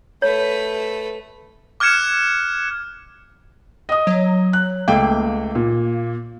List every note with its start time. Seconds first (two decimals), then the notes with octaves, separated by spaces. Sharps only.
0.22 A3 B4 C#5
1.80 D6 F6 F#6 G#6 C#7 E7
3.89 D#5 D#6
4.07 F#3
4.53 F#6
4.88 C#2 A3 A#3 G5
5.55 A#2